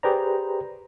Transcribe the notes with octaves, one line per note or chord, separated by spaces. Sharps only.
G4 G#4 B4 C5 D5 A#5